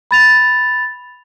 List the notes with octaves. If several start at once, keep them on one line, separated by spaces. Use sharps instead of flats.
B5 A6 F7